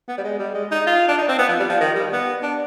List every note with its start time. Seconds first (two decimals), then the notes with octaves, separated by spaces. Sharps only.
0.08 B3
0.18 G3
0.24 G#3
0.39 G3
0.55 G#3
0.71 D#4
0.86 F4
1.08 D4
1.18 D#4
1.28 C4
1.39 B3
1.49 F3
1.60 G3
1.70 F3
1.81 D#3
1.96 G3
2.12 B3
2.43 D4